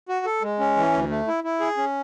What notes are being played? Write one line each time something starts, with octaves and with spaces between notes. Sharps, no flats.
F#4
A4
G#3
C#4
E3
D2
A3
E4
E4
G#4
C#4